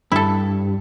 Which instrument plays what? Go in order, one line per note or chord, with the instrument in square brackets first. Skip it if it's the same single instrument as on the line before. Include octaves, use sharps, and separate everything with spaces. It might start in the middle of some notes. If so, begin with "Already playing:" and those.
[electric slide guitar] G2 [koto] E4 A4